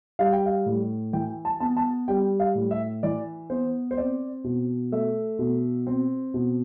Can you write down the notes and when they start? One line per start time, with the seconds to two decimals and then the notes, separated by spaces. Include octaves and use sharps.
0.19 G3 F5
0.33 G5
0.46 F5
0.66 A2
1.13 E3 G5
1.45 A5
1.60 B3 A5
1.77 A5
2.08 G3 G5
2.40 F5
2.55 A2
2.71 E5
3.03 E3 D5
3.50 B3 C5
3.91 C5
3.97 C4 D5
4.44 B2
4.92 A3 E5
5.39 B2
5.87 C4
6.34 B2